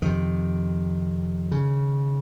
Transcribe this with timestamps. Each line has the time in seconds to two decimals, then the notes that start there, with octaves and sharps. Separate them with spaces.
0.02 F2 C3 D#3
1.52 C#3